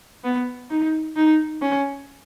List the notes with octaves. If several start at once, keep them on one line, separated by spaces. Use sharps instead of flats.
B3
D#4
D#4
C#4